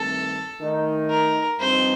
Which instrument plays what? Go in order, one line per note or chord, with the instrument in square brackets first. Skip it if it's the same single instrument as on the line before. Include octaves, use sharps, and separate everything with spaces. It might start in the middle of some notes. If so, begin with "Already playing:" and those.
Already playing: [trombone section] G2 D#3 A3 C4 [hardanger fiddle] A4
[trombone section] D#3 A3 D#4
[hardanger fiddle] A#4
[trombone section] G2 F3 C4 D#4 [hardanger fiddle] C5